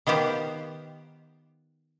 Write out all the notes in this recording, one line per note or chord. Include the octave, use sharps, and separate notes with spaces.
D#3 B3 F4 G4 C5